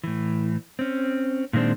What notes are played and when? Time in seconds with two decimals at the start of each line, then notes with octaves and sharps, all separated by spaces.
0.04 A2 E3
0.79 C4 C#4
1.53 A#2 D#3 G#3 C4 D4